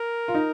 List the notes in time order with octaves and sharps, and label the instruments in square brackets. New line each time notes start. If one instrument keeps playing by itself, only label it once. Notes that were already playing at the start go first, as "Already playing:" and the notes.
Already playing: [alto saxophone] A#4
[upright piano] F4
D#4